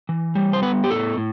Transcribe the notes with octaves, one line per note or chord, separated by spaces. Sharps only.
E3
G3
C5
B3 B4
G4
A2 A4
A2